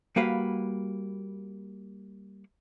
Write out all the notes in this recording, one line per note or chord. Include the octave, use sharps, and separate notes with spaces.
G3 A#3 F#4 B4 F5